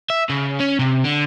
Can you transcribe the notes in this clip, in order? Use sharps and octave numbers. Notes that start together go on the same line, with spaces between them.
E5
C#3
C#4
C3
D3